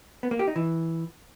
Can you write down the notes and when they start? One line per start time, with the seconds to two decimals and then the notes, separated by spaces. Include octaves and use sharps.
0.23 B3
0.31 A#3
0.39 G4
0.47 D#4
0.56 E3